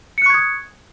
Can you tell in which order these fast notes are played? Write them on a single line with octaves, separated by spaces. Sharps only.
C#7 F#6 C#6 G#6 D#6